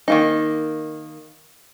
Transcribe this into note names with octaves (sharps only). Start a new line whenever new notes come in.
D#3 A#3 D#4